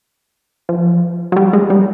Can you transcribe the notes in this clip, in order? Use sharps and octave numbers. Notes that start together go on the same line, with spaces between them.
F3
F#3
G3
G#3
G3